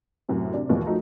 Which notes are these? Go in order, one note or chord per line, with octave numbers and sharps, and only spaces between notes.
F#2 A2 C3
C3 D4
A#1 D#2 B2 E3 G#3
F3 F#3 A3 D#4